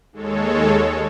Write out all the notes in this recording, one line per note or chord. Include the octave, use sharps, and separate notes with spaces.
D#2 G#3 A4 C#5